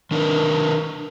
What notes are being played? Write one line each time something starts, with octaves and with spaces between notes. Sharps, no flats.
D#3 D4 A#4 B4